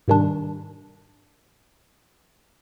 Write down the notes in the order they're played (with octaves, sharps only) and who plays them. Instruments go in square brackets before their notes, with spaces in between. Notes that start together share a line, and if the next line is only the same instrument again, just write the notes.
[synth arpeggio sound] G#2 C3 D#3 G3 D4